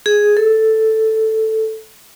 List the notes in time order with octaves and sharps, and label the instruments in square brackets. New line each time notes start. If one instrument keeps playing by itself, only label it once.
[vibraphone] G#4
A4